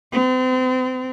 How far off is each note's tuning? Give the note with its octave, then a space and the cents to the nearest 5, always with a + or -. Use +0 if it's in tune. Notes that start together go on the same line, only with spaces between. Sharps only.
C4 -35